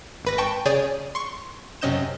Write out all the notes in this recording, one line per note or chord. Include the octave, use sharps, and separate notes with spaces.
G#1 B4 A#6
G5 A5 C#6
C#3 G#4 C#5 D5 G6
C6 C#6
F#2 C3 C#4 D#5 G6 E7